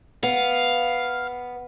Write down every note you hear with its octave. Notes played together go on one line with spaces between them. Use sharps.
B3 F5